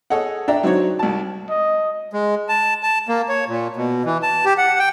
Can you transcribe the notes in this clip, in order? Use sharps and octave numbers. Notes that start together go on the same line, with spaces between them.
G#4 A4 C#5 D#5 F#5
D4 D5 E5 G5 A#5
F#3 C4 D4 D#4 F#4 C#5
C2 A5
D#5
G#3
A5
A5
A#3
C#5
A#2
B2
E3
A5
G4
F#5
G5